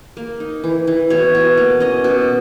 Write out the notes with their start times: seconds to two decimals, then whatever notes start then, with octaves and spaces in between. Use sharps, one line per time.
0.17 A#3
0.40 D#4
0.64 E3
0.87 E3
1.10 B2 C#5
1.35 B2
1.57 A#3
1.80 C#4 D#5
2.04 B2